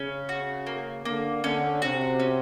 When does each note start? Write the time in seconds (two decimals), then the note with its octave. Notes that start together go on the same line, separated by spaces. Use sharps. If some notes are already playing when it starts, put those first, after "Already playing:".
Already playing: C#3 C#4
0.29 F#4
0.67 A#3
1.05 D3 A#3
1.44 D3 C#4
1.82 C3 F#4
2.20 C#4